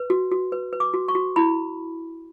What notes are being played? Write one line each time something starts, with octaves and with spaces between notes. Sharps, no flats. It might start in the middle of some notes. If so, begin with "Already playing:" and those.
Already playing: B4
F#4
F#4
B4
B4
D6
F#4
C#6
F#4
E4 B5